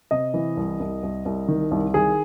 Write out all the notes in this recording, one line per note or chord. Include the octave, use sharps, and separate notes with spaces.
C3 D#5
E3
C2
C2
C2
C2
D#3
C2
D#3 G#4